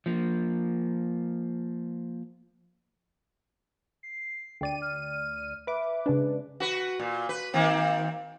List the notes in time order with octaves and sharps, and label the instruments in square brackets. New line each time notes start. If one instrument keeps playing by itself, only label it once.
[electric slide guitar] F3 A#3
[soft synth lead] C7
[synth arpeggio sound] D2 D5 D#7 [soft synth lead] G5
[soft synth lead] F6
[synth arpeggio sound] B4 D6 [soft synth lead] E5
[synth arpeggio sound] C#3 G#3 D4 [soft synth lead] B4
[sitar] F#4 B4
A#2
B4
D#3 A#3 C4